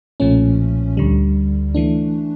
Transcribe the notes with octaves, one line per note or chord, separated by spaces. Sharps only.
B1 A#2 F3 A3 C#4
D2 D3 G3
E3 A3 D4